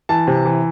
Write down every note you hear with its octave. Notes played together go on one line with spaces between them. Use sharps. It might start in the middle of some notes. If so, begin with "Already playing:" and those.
E3 A5
C3
E3